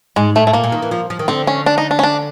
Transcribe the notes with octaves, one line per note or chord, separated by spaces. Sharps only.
G#2 G#3
A2 A3
A3
A#2 A#3
A#2
D#3
E3
F3
F3
D#3
D3 C4
C#4
D4
D#4
D4
C#4
D4